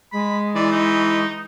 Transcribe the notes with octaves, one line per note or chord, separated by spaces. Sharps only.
G#3 B5
E3 D5
D#4